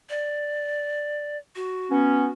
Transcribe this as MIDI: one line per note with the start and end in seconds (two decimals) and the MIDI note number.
0.10 1.37 74
1.56 2.31 66
1.91 2.27 59
1.91 2.27 61